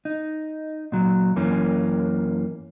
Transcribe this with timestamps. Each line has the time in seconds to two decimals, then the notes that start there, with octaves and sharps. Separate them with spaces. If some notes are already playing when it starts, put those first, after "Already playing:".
0.05 D#4
0.92 A#2 F#3
1.36 F#2 E3 A#3 C#4